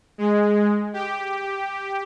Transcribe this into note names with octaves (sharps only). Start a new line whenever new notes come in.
G#3
G4